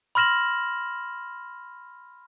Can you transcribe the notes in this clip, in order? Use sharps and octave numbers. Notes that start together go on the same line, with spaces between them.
B5 C6 F6 A#6 E7 F#7